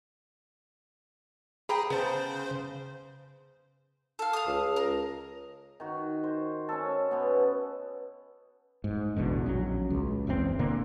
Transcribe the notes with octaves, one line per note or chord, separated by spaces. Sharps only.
G#4 G5 A#5 B5
C#3 B3 C5 A5
A4 F5
F5 D#6
C#2
A#4
D#3 F#4
C5
C#4 A4
B2 B3
G#2
A1 E2 B2 D3
A#1 F#3 C#4
C#2
F#1 E2 G2 C4
A#2 D3 A#3